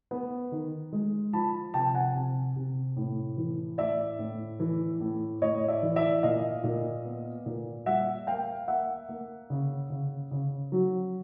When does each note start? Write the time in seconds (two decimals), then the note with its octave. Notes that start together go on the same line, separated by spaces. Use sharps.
0.11 B3
0.52 D#3
0.93 G#3
1.33 F3 A5 B5
1.74 C3 G5 A5
1.95 F#5 G#5
2.15 C3
2.56 C3
2.97 A2
3.37 E3
3.78 A2 D5 E5
4.19 A2
4.60 E3
5.00 A2
5.42 A2 C#5 D#5
5.68 D5 E5
5.83 E3
5.96 D5 E5
6.23 A#2 D#5 F5
6.64 A#2
7.05 B3
7.46 A#2
7.86 G3 E5 F#5
8.27 A#3 F5 G5
8.68 A#3 E5 F#5
9.09 A#3
9.50 C#3
9.90 C#3
10.31 C#3
10.72 F#3